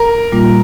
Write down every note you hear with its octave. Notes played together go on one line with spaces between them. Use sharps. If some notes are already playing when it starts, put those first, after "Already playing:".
Already playing: A#4 A#5
A#2 G3 A#3 F4